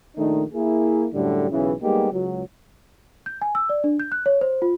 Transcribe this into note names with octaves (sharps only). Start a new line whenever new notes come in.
A#1 D#3 A3 D4 D#4
A#3 E4 G#4
F#2 A2 D3 G3
B1 C#3 E3
G3 G#3 A#3 B3 D#4 G4
C#2 F#3
G6
G#5
E6
D5
D4
G6
F#6
C#5
C5
F4